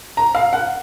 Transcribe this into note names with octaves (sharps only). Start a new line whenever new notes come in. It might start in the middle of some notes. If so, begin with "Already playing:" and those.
A#5
F5
F#5